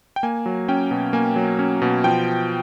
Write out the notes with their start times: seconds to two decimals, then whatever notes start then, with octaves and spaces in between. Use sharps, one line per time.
0.16 G5
0.23 A#3 G#5
0.46 F#3
0.68 C#4 G5
0.91 B2
1.13 A#3 G#5
1.36 F#3
1.59 C#4
1.82 B2
2.04 F3 G5